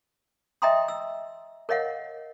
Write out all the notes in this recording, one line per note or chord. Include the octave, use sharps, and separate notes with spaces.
D#5 E5 G5 A#5 C6 D#6
E6
A#4 C#5 D#5 F5 F#5